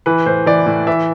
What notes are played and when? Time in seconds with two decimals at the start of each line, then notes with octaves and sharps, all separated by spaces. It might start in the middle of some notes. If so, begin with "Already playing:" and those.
0.06 E3 B4
0.26 A2 C5
0.46 E3 D5
0.66 A2
0.87 E3 E5